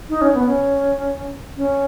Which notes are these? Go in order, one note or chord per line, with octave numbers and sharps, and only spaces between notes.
D#4
C#4
B3
C#4
C#4